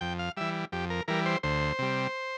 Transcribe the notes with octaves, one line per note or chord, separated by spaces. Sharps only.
F2 G5
F5
E3 G3 E5
F2 G4
A#4
E3 G3 A#4
C5
D2 C5
C3 G3